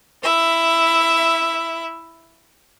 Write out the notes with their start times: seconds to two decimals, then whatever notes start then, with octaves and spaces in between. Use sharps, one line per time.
0.23 E4 E5